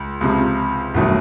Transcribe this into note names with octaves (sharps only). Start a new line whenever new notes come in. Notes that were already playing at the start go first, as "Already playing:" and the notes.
Already playing: C#2
C#2 C3 F3
G1 D#3 F#3 A3